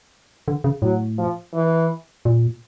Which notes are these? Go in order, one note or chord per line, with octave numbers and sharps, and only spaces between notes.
D3
C#3
A2 F#3
F3
E3
A#2